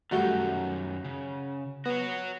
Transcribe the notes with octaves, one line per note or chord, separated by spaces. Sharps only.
F#2 D#3 G3 A3 F#4 G6
C#3
B3 F#4 C#5